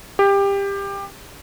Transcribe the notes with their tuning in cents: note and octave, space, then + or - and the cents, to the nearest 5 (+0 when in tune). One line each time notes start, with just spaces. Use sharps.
G4 +20